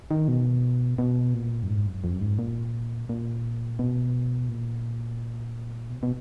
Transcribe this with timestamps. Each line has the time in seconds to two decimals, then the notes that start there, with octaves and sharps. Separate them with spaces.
0.11 D#3
0.28 B2
0.98 B2
1.34 A#2
1.63 F#2
1.69 G#2
1.87 F#2
2.04 F2
2.14 F#2
2.21 G#2
2.39 A#2
3.09 A#2
3.79 B2
4.49 A#2
5.90 B2
6.03 B2